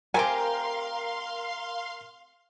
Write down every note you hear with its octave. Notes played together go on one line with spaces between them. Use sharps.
A3 C4 G4 A#4 F5 G#5 A#5 C6